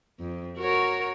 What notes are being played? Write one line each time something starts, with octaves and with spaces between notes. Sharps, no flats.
F2
F#4 A#4 C#5